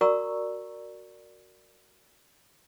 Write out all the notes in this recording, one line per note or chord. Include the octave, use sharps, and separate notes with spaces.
F#4 A#4 D5 A#5 C#6 E6